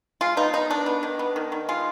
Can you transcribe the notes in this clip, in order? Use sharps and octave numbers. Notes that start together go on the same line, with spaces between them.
G#3 F4
B3 D#4
B3 D#4
D#3 D4
B3
D#3
B3
D#3
D#3
G#3 F4